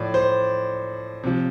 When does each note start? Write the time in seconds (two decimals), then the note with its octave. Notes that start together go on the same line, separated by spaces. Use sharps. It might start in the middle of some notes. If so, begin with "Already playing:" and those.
Already playing: A2 F3 D5
0.14 C5
1.23 C3 F3